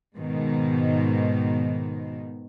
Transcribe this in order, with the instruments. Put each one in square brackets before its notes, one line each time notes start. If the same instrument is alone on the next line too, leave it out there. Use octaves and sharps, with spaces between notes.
[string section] G#2 B2 D#3